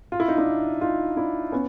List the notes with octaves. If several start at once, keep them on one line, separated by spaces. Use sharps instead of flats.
F4
E4
D#4
D4 E4
D#4 F4
D4 E4
B3 C#4